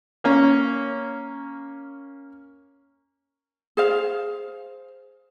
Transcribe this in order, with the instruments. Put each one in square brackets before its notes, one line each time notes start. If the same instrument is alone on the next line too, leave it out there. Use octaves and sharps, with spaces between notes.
[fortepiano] A#3 C#4
[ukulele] G#4 C5 F5